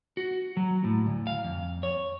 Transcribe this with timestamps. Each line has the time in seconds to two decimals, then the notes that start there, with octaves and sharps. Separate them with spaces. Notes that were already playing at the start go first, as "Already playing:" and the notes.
0.17 F#4
0.57 F#3
0.84 A2
1.07 D2
1.27 F5
1.44 F2
1.83 C#5